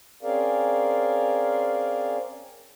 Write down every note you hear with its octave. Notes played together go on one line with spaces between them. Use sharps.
C4 C#4 G#4 A#4 D5 F5